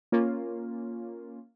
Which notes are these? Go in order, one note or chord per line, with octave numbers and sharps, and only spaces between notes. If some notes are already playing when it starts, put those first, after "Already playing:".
A#3 C#4 F4